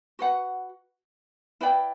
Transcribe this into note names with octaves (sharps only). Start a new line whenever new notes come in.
F#4 B4 F#5
E4 B4 D5 G5